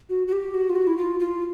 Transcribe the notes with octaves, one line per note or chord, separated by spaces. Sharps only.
F#4
F#4
G4
F#4
F4
F#4
E4
F4
F4